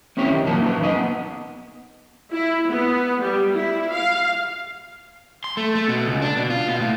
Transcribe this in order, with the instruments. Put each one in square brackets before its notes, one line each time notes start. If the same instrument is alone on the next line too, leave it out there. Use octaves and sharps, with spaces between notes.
[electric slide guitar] C4 C#4 E4 G4 C#5
D#3
F#2 A#2 F3 F#3 A#4 A5
D#4 B4
F#2 B4 D#5 G#5
B3
[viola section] E4
B3
G3
E4
F5
[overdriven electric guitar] C6
A3
A3
B2
C#2
D4
B2
F4
B2
A2